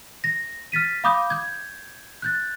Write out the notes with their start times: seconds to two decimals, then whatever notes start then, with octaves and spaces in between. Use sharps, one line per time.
0.24 A#6
0.72 F6 A6 B6 D#7
1.04 F5 B5 D6 D#6 G6
1.30 G6 G#6
2.22 F#6 G6 A6